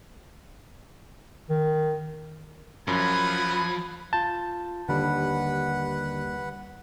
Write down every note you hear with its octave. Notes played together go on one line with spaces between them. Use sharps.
D#3
F#2 F3 E4 F#5 G#5 B5
F4 A5 G6
D#2 D3 G3 B4 F#5